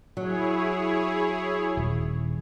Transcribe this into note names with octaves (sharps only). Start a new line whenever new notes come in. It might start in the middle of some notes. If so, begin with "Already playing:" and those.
F#3 E4 G#4 C#5
D#1